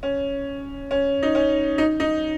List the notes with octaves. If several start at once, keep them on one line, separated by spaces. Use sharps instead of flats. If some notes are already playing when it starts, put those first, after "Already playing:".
C#4
C#4
D#4
C#4
D#4
D#4